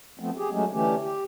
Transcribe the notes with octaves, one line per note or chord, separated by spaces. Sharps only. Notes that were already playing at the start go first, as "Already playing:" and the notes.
F3 A3 B3 C4
G4 G#4
F#3 G#3 A3 C#4
D3 E3 A3 C#4 G4
G4